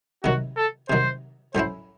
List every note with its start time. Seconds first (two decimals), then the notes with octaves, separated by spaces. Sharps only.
0.24 C3 D#3 F#3 F#4
0.56 A4
0.89 C3 D#3 F#3 C5
1.55 A2 F#3 C#4 E4 C5